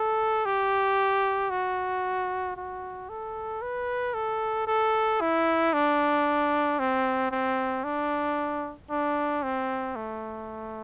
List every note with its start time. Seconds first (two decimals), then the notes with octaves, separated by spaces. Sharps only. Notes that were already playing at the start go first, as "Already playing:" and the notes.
Already playing: A4
0.45 G4
1.50 F#4
2.56 F#4
3.09 A4
3.62 B4
4.14 A4
4.67 A4
5.21 E4
5.73 D4
6.79 C4
7.31 C4
7.84 D4
8.90 D4
9.43 C4
9.96 A3